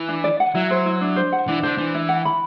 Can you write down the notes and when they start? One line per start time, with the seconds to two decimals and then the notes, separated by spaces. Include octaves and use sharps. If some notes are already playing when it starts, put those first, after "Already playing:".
Already playing: E3
0.09 D4
0.24 D5
0.40 F#5
0.54 F#3 E4
0.71 C5
0.86 E4
1.01 D4
1.16 C5
1.32 F#5
1.47 E3 D4
1.63 D3 C5
1.78 E3 D4
1.94 E4
2.09 F#5
2.25 B5